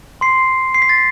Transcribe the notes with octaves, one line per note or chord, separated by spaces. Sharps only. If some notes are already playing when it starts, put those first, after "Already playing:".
C6 C7
C7
B6
A6